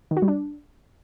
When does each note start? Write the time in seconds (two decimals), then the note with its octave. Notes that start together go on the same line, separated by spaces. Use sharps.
0.11 D#3
0.17 F#4
0.22 G3
0.28 D4